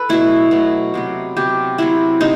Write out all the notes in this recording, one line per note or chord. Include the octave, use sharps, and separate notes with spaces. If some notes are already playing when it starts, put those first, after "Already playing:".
Already playing: A4 B4
B2 F#3 A3 E4
B2 F#3 A3
C3 F#3 B3
C3 F#3 B3 G4
C3 F#3 B3 E4
C3 D#4